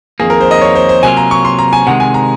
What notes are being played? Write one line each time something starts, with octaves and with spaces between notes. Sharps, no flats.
F2 D#3 A#3 G#4
A#4
C5
D#5
C#5
C5
C5
C3 F#3 A#3 F4 G#5
A#5
C#6
C6
A#5
G#5
C3 D#3 G#3 F#5
G#5
A#5